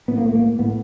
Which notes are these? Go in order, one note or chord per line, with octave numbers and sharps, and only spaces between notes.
A2 B3
A#3
A3
A#3
A2 B3